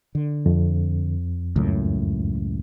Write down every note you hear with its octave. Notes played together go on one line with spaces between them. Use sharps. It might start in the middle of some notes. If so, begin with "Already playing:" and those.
D3
F2
C#2 F#2 A2